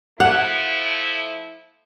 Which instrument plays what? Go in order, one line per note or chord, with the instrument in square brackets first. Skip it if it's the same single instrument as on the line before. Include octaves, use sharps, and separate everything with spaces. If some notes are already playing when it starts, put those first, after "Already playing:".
[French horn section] F3 A3 E4 [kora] F#5